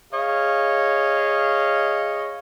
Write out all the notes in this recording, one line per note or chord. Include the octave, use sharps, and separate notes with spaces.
G#4 C#5 D#5 F5